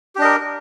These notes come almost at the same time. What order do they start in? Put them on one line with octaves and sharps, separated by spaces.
G4 D4 D#5 A#4